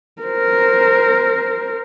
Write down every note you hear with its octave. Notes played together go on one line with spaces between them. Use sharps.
A#4 C5